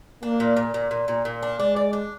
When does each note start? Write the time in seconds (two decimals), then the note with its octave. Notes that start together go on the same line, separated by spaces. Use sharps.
0.23 A#3 D4
0.40 A#2
0.57 A#2
0.74 A#2
0.91 A#2
1.08 A#2
1.25 A#2
1.43 D4
1.60 G#3 D4
1.76 D5
1.93 D4